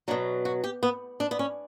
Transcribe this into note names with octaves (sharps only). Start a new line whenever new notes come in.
B2 F#3 D4
F#4
G4
B3
D4
B3
C#4